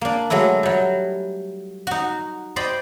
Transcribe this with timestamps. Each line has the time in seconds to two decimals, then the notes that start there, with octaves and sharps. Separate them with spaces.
0.01 A#3 D4
0.30 F#3 G#3 A3 E4
0.63 F#3 G3
1.87 D#4 F#4
2.56 C5 D5 D#5 G5 B5